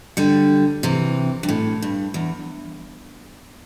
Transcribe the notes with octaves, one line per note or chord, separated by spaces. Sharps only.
D3 G3
C3 E3
G2
A2
G2
E2